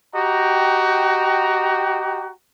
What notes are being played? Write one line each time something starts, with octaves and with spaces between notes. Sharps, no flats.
F#4 G4 D#5 G5 A#5